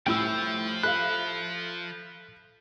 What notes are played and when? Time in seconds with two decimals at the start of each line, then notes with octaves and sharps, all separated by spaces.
0.07 C2 A2 F3 E4 G5 E6
0.83 A4 E5 F5 B5 F#6